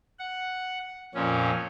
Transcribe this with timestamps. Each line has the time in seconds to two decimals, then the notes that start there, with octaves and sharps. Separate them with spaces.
0.19 F#5
1.14 F2 A#2 C#4